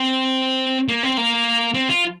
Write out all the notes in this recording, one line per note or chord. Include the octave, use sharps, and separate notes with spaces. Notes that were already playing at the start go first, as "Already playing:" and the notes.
Already playing: C4
A#3
C4
A#3
C4
F4